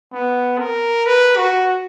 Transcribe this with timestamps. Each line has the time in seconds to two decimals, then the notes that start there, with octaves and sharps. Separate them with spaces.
0.12 B3
0.59 A#4
1.06 B4
1.37 F#4